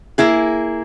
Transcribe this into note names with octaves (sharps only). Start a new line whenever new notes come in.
A#3 E4 G#4